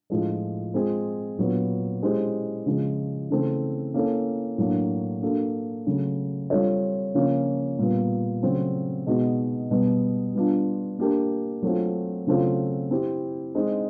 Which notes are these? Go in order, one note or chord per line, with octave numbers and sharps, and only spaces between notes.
A2 F3 G#3
G#3 C4 F4 G#4
A#2 F#3 B3
G#3 C#4 E4 G4 C5
C#3 F3 G#3
C#3 E3 A3 C4
A#3 C#4 E4 A4
A2 F#3 A#3 D4
A#3 D4 F#4 A4
C#3 F#3 A3
G3 C4 F4 A4 C#5
C#3 F3 A#3 C#4
A#2 G3 B3
C#3 F#3 A3 C4
B2 G#3 B3 D#4 F#4
B2 G3 B3
G3 B3 D4 F4
A#3 D4 G4 A#4
F#3 A3 C4 F4
C#3 F#3 A3 C4 F4
C4 E4 G4
G#3 C4 D#4